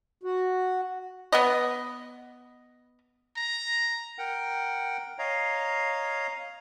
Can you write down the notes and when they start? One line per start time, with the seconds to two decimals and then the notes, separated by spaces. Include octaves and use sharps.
0.23 F#4
1.32 B3 B4 D#5
3.37 A#5
4.18 A#4 F#5 G5
5.19 C#5 D#5 F5 A#5